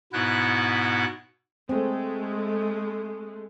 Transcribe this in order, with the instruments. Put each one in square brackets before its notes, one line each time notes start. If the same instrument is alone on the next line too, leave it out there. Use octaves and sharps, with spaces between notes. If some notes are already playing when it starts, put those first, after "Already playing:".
[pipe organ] G#2 B2 B3 E4 F#6
[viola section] G#3 A3 [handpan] C4